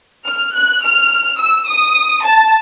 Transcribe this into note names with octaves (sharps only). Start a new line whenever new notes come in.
F6
F#6
F6
E6
D#6
A5